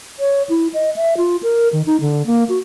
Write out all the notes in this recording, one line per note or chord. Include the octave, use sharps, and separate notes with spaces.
C#5
E4
D#5
E5
F4
A#4
D#3
D#4
D3
A#3
F#4